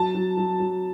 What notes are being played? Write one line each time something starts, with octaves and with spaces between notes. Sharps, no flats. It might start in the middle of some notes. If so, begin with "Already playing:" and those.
Already playing: F#3 A5
F#3
F#3
F#3